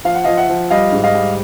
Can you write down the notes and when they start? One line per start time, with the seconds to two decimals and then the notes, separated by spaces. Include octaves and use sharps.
0.05 F3 F5
0.15 F#5
0.24 F3 D#5 F5
0.37 E5 F#5
0.49 F3
0.70 G3 D#5 F5
0.92 G#2
1.04 D#5 F5
1.15 G3